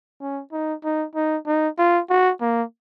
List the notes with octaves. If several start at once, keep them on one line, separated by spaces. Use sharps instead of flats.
C#4
D#4
D#4
D#4
D#4
F4
F#4
A#3